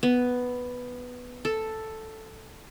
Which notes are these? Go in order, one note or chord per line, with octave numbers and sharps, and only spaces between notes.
B3
A4